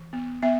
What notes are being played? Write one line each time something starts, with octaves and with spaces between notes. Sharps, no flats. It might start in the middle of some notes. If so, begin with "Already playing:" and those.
Already playing: E3
B3
B3 E5